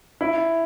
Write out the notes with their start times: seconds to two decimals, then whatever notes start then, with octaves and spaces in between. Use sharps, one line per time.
0.21 E4